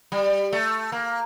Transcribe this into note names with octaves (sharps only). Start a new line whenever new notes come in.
G3
A3
A#3